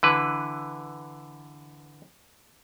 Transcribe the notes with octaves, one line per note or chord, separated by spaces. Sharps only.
D3 E3 B4